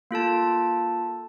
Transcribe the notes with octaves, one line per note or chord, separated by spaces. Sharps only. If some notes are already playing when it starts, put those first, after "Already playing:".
A#3 F4 A4 A5